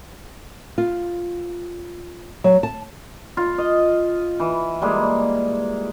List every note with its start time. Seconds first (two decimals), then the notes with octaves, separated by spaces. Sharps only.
0.78 F4
2.44 F#3
2.63 A5
3.37 F4
3.58 D#5
4.40 E3
4.82 G3 G#3 A#3